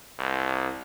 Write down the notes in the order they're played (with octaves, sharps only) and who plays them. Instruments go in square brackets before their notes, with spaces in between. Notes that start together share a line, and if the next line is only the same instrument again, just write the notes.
[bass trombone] C2